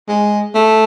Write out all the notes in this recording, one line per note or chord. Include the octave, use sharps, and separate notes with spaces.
G#3
A3